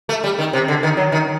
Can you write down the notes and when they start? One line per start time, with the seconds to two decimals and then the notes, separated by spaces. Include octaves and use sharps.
0.09 A3
0.24 G3
0.39 D#3
0.53 C3
0.68 D3
0.83 D#3
0.97 F#3
1.12 D#3